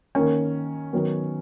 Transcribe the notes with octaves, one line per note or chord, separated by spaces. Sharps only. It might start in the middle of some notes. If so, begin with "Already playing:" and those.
D#3 A#3 C#4
D#3 F#3 B3